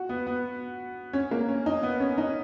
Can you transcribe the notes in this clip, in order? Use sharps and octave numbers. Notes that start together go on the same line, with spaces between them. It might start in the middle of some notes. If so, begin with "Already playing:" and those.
Already playing: F#4
B3
B3
C#4
A#3
C#4
D#4
B3
C#4
D#4